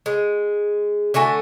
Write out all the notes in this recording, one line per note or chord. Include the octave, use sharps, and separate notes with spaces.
G#3
D3 A3 F#4 G#5